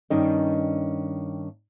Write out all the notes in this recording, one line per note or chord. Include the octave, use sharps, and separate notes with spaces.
G2 D#3 C#4 D#5